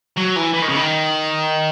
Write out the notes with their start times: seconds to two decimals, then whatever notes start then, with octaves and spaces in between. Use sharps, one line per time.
0.17 F#3
0.36 E3
0.54 E3
0.62 D#3
0.69 C#3
0.76 D#3